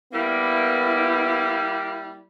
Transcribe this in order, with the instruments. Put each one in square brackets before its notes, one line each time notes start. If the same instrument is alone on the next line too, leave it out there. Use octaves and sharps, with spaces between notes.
[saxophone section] G3 A#3 [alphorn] B3 [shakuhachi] E4